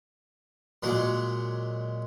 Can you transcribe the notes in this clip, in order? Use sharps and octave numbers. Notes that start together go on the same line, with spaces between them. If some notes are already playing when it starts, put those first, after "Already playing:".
A#2 F#3 G#3